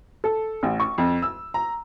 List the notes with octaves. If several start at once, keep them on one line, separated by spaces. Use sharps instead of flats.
A4
A1
C#6
F2
E6
A#5